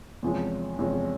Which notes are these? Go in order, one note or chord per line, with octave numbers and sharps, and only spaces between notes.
E2 C3 F3 G#3 C#4
E2 C3 F3 G#3 C#4